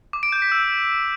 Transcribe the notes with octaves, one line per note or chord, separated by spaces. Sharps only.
D6
D7
G6
B6
E6